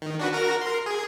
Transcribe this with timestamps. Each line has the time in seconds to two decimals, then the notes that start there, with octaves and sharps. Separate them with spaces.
0.02 D#3
0.20 D4 F#4 B4
0.32 F#4 A#4 A#6
0.61 A#4 C6
0.86 G#4